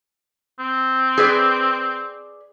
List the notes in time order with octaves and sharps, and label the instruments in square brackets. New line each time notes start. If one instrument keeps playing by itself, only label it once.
[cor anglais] C4
[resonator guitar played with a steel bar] G#4 B4 D5